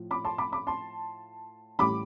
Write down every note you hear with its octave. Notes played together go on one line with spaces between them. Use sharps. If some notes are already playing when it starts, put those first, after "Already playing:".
Already playing: A2 F3
B5 D6
A5 C6
B5 D6
B5 D6
A5 C6
A1 A2 G3 B5 D6